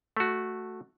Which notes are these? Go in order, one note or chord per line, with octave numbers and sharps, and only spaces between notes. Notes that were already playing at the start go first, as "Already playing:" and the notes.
A3 F#4